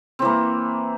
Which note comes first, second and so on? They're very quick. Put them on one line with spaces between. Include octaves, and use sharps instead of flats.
C4 E3 A#3